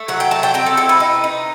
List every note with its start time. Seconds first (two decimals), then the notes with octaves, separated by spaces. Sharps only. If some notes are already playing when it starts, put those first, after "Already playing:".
Already playing: A3
0.08 F#3 F#5
0.20 G5
0.31 F#3 A5
0.43 G5
0.54 C4 G5
0.66 A4
0.77 E4 A4
0.89 B4
1.00 D#4
1.24 D#4